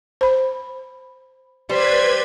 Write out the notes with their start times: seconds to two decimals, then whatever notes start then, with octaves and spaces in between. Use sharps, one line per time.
0.21 C5 B5
1.69 G3 B4 C5 D5 B5 G#6